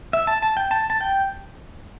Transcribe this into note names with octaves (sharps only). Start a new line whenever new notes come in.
E5
A5
A5
G5
A5
A5
G5